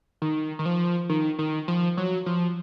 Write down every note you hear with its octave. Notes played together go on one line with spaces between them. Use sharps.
D#3
D#3
F3
D#3
D#3
F3
F#3
F3